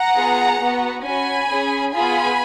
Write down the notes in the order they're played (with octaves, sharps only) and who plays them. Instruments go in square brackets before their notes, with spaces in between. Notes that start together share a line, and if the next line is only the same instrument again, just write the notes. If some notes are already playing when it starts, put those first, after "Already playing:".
Already playing: [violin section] F#5 A#5
B3 F4 G#4
B3 F#4
C#4 F#4 G#5 B5
C#4 G#4
B3 F4 G#4 G#5 B5